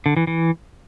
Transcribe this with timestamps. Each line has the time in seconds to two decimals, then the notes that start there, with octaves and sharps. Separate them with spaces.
0.06 D3
0.17 E3
0.27 E3